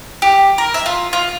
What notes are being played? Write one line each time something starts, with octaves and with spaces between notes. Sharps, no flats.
G4
A#4
E5
F4
F4